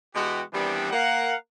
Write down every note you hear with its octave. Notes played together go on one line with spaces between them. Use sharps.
B2 E3 G#3 F#4 G4
D#3 E3 G3 B3 C4 D4
A#3 A#4 F5 F#5